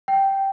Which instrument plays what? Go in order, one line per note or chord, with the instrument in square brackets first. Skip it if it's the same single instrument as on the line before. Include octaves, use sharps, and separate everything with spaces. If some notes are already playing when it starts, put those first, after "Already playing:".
[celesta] G5